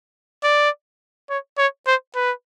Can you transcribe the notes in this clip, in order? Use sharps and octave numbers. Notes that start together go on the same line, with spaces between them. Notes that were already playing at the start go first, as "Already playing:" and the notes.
D5
C#5
C#5
C5
B4